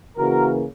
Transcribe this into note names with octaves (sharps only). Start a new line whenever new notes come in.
C#3 E3 A#3 F#4 A#4